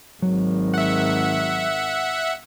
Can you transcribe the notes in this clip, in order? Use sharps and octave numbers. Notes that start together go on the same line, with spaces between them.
G#1 D#3 F#3
E5 F#5